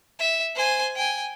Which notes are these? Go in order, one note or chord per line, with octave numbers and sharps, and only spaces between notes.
E5
C5 G#5
G5 G#5